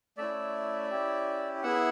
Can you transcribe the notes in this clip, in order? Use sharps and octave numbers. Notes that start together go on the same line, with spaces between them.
A3 C#4 E4 D5 E5
C#4 E4 G4
B3 E4 G#4 E5 F#5